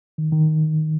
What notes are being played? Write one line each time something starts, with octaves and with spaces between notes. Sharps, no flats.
D#3
D#3